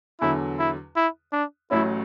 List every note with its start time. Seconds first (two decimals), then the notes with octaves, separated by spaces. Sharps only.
0.21 E2 D3 F#3 E4
0.59 E4
0.96 E4
1.33 D4
1.71 A1 A2 F#3 C#4 E4